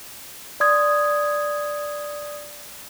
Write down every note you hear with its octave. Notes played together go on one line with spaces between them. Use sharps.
D5 C6 D#6 G#6